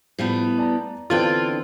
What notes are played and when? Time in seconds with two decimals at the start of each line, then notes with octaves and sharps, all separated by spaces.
0.18 A2 F3 G3 B3
0.58 D5 A5 A#5
1.10 D3 E3 B3 C4 D4 F4 G5